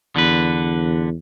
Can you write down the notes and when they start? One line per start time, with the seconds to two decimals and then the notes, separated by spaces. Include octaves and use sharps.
0.16 E2 D3 B4